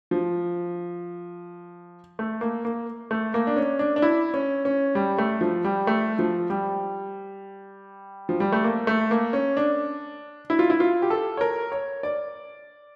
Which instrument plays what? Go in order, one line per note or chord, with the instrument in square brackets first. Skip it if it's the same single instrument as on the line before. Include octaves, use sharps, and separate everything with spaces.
[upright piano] F3
A3
A#3
A#3
A3
A#3
D4
C#4
D4
D4
E4
C#4
C#4
G3
A3
F3
G3
A3
F3
G3
F3
G3
A3
A#3
A3
A#3
C#4
D4
E4
F4
E4
F4
G4
A4
C#5
A#4
C#5
D5